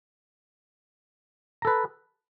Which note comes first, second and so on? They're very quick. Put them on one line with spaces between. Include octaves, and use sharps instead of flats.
A#5 A4 B4